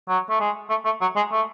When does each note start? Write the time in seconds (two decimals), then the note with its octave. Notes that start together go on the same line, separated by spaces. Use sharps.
0.09 F#3
0.30 A3
0.40 G#3
0.70 A3
0.85 A3
1.01 F#3
1.16 G#3
1.32 A3